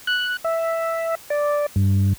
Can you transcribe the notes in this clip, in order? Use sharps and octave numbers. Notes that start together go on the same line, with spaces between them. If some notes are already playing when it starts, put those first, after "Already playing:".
F#6
E5
D5
G2